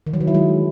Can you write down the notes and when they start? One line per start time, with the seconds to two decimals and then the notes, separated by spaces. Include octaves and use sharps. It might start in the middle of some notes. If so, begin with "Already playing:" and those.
0.07 D#3
0.13 F#3
0.20 E3
0.27 E4
0.34 G#3